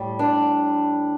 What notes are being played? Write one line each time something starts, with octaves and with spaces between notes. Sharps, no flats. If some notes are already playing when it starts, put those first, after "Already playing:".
Already playing: A2 G3
D4